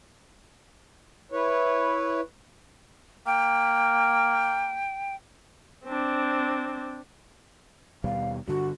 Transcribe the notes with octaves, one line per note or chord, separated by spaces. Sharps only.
E4 B4 C#5
A#3 G5
C4 D4
D#2 B2 G3 F5
G2 D3 F#4